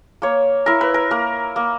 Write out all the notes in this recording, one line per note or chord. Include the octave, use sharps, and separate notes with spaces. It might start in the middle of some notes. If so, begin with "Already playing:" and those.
A#3 C#5
E4 A#4
B4
A#4
A#3 A#4
A#3